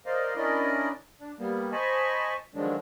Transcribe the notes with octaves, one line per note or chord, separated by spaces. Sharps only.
A#4 C5 D5 D#5 F5
C#4 D4 E4 A#4 D5 D#5
D4
G3 A#3 B3
C5 D#5 G#5 A5 B5 C#6
D3 D#3 F3 F#3 G#3 D4